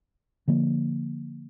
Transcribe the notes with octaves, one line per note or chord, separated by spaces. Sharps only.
D3 F3 A#3